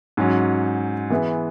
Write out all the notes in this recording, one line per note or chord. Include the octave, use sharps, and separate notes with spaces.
G#2 F#3 C#4
E3 B3 E4 G#4